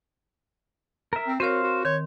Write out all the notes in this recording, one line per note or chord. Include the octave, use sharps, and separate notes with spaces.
A#4 E5
C4
C4 F#4 A#4 C5 C#5 F5
F#4
D#3 C#5 C6